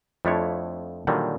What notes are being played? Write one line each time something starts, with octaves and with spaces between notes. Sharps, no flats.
F2 F3 A3 D4 E4 C#5
A#2 D3 D#3 F#3 G3